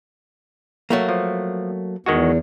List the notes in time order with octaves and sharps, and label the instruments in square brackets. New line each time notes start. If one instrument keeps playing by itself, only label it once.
[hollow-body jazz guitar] F#3 A3 A#3
[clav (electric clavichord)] F3
[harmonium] E2 [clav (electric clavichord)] D#3 G#3 F#4